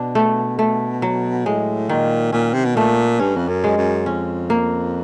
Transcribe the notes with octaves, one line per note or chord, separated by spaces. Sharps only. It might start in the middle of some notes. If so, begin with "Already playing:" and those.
Already playing: B2 D4
A3
A3
F#3
A2 G#3
A#2 D#3
A#2 C#4
C3
B2
A#2 A3
G2 C#4
F2
F#2
G#3
F#2
F2 C#4
A#3